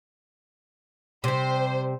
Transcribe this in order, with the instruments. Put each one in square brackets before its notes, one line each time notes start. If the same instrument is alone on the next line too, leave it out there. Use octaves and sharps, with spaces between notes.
[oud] C3 G3 [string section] C5